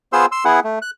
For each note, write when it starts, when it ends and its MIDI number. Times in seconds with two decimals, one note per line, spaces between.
0.13 0.26 59
0.13 0.26 65
0.13 0.26 68
0.13 0.26 72
0.13 0.26 84
0.13 0.26 88
0.32 0.44 84
0.32 0.44 88
0.45 0.60 59
0.45 0.60 64
0.45 0.60 68
0.45 0.60 78
0.64 0.79 57
0.82 0.90 90